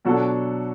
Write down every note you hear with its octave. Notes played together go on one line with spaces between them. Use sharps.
B2 F#3 D4 F#4 A4